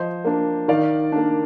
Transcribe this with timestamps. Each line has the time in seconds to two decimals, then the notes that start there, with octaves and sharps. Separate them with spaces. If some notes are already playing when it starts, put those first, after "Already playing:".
Already playing: F3 C5 D#5
0.25 A#3 D4
0.68 D#3 D5 F5
1.12 A#3 D4